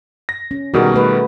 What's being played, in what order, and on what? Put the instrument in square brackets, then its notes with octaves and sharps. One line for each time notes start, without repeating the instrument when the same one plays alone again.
[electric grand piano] A#6
[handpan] C#4
[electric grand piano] B2 D#3 G3 [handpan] F#4 G#4 A#4
[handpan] A3 B4